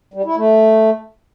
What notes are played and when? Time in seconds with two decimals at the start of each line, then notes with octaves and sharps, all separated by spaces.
0.14 G3
0.25 E4
0.36 A3